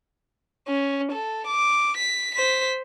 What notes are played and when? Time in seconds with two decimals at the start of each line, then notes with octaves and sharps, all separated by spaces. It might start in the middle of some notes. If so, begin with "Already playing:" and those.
0.68 C#4
1.12 A4
1.47 D6
1.97 B6
2.35 C5 B6